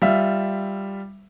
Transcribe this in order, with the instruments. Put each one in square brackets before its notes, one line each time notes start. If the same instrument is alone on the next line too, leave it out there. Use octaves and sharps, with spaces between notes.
[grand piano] G3 F4 E5